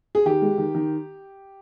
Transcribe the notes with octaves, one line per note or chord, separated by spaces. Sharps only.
G#4
D#3 G4
G#3
D#3
D#3